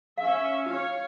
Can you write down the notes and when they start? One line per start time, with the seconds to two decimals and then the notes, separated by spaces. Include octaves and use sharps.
0.18 C#4 E5 F5
0.66 F4 C#5 F5